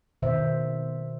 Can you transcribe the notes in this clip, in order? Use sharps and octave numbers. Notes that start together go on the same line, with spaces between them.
B2 D#3 C5 E5